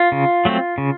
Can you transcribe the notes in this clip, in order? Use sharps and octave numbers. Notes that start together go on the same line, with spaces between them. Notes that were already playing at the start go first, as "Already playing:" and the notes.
Already playing: F4
C#3
F#3 A3 C4
C#3